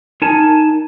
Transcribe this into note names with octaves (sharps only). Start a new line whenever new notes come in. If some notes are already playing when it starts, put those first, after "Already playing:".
D#4 A#4 G#5 A5